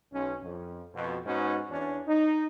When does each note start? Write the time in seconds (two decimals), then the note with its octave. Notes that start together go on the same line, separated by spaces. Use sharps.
0.12 B1 C#4
0.43 F2
0.94 F2 B2
1.25 G#2 B3 C#4 D#4 F#4
1.71 E2 C#4 D4
2.07 D#4